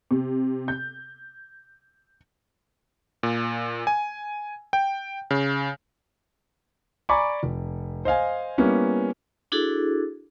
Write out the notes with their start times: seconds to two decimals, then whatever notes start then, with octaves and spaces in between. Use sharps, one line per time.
0.11 C3
0.68 G6
3.23 A#2
3.87 G#5
4.73 G5
5.31 C#3
7.09 D5 G#5 A#5 B5 C#6 D6
7.43 F1
8.05 C5 D#5 F5 G#5
8.58 G3 A#3 B3 C#4 E4
9.52 D4 E4 F#4 G#4 A4